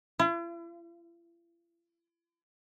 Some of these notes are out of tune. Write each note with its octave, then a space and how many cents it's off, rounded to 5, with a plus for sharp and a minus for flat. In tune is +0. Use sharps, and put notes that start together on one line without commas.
E4 +45